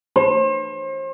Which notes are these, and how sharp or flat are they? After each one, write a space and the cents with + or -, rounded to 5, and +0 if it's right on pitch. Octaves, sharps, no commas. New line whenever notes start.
C5 +40